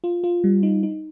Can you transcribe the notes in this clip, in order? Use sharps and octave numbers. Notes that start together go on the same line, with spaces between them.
F4
F4
G3
D#4
D#4